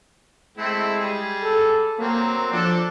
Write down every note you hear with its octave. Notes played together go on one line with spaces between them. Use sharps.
G#3 A3 C4 E4
G3 G#4
A4
F#3 A#3 C4
F3 D4 A4